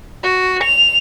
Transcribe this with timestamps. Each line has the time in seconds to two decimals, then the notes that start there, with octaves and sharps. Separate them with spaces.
0.23 F#4
0.63 F7